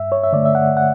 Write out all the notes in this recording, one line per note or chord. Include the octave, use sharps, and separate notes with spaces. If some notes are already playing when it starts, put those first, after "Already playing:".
Already playing: G2 E5
C#5
E5
D3 A3 D5
E5
F#5
F#5